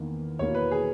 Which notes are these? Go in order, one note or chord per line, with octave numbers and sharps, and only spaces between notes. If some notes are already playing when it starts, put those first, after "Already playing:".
Already playing: E2 D#3 A#3
E2 B2 A#3 E4 C#5
B4
G#4